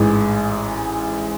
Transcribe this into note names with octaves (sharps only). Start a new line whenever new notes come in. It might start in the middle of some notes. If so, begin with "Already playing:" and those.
Already playing: A1 G#2 E3 G#3